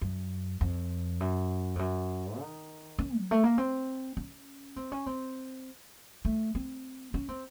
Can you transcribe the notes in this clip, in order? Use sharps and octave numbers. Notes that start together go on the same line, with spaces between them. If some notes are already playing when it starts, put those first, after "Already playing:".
F#2
F2
F#2
F2
F#2
D#3
C#4
F#3
A3
A#3
C4
C#4
C4
C#4
C4
A3
C4
C#4
C4